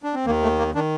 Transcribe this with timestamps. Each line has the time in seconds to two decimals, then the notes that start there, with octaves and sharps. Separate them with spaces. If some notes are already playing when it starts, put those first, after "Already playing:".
0.03 D4
0.14 C4
0.26 D#2 D#3 A#3
0.43 A3
0.59 A#3
0.75 D#3 D4